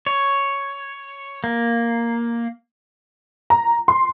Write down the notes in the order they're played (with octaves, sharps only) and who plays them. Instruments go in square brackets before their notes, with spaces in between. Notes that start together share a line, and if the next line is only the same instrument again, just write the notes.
[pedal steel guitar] C#5
A#3
[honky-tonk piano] A#5
C6